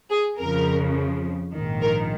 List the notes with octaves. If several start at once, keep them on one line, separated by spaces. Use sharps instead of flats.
G#4
F2 C#3 F3 A#4
A#1 G#2 D#3
A#4